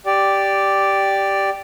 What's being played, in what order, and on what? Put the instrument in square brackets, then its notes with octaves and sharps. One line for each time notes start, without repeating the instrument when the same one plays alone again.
[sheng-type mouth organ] G4 D5